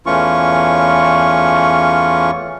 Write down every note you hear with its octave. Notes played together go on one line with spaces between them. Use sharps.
E2 E3 A3 C#4 F4 C#6